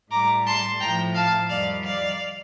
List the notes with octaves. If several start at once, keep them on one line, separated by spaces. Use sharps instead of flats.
A2 G3 A#5 D6
A5 C6
A2 F3 G5 A#5
F5 A5
F2 D#3 G3 D5 F5
D5 F5